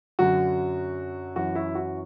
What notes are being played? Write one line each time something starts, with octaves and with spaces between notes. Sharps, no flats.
F#2 D3 F#3 F#4
F#2 E3 F#4
E4
F#4